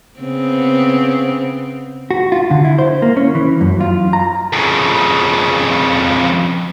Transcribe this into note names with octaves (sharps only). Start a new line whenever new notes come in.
C#3 B3 C4
F#4
F4
D3
E4
C5
A#3
C#4
E3
F#2
F4
A#5
F2 C#3